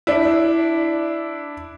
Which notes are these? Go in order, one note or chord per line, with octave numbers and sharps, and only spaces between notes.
D4 E4